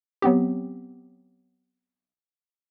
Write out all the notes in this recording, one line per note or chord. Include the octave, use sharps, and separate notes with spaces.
F#3 B3 C4 G4